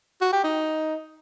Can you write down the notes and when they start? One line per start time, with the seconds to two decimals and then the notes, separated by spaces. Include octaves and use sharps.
0.21 F#4
0.33 G4
0.44 D#4